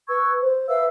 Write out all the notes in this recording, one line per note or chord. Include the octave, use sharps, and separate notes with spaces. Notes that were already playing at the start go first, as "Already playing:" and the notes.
B4 C#6 E6 G#6
C5
B4 E5 F5 E6